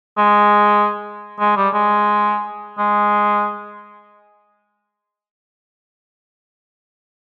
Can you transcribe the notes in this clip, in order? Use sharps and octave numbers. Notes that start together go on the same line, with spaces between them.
G#3
G#3
G3
G#3
G#3